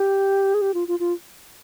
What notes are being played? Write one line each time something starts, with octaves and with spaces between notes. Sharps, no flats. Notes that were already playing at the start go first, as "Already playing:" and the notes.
Already playing: G4
G#4
G4
F4
F4
F4